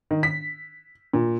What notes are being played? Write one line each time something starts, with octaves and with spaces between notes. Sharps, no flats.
D#3
B6
A#2